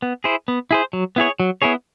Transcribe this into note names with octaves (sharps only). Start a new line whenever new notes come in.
B3
E4 G#4 C5
B3
E4 G#4 C5
F#3
B3 E4 G#4 C#5
F#3
B3 E4 G#4 C#5